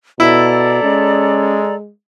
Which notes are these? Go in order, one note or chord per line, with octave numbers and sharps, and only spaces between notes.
B2 E4 A4 D5 A#5
G#3 C#4